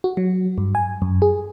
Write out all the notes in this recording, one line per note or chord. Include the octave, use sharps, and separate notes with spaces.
F#4
F#3
G2
G#5
F#2
G#4